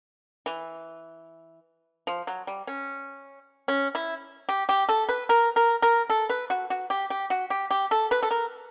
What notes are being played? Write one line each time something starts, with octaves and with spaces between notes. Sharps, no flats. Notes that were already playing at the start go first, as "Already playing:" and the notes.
E3
F3
F#3
G3
C#4
C#4
E4
G4
G4
A4
B4
A#4
A#4
A#4
A4
B4
F#4
F#4
G4
G4
F#4
G4
G4
A4
B4
A4
A#4